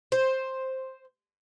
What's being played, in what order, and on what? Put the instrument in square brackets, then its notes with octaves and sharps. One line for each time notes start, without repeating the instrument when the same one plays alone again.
[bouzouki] C5